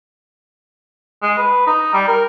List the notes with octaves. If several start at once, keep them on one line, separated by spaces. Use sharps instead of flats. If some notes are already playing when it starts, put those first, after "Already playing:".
G#3
B4
D#4
G3
A#4